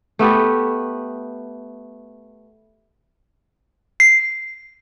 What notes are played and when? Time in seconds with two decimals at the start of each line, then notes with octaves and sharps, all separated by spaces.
0.19 A3 B3 G4
4.00 C7